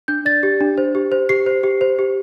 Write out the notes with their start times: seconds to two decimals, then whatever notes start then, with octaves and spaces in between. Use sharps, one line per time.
0.08 D4 G6
0.25 D5 A6
0.43 G4
0.61 D4
0.78 C5
0.95 G4
1.12 C5
1.29 G4 C7
1.46 C5
1.63 G4
1.81 C5
1.99 G4